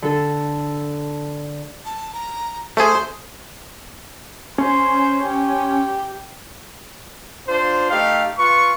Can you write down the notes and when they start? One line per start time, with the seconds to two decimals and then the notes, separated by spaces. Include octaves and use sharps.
0.02 D3 A4
1.85 A5
2.13 A#5
2.77 A3 G#4 C5
4.58 C#4 C5
5.23 G4
7.48 D4 F4 C5
7.90 A3 D#4 G4 F5
8.39 F4 B4 C#6